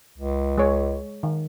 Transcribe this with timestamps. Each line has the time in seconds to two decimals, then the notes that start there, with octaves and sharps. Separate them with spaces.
0.18 C#2
0.58 G#3 C#5
1.23 D#3